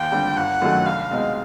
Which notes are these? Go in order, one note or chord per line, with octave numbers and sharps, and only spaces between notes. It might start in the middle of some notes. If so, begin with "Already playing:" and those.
Already playing: D#2 G5
D3 G3 C4
G1 F#5
F#2 D#3 F#3 A3
C2 F5
B2 G#3 C4 D#4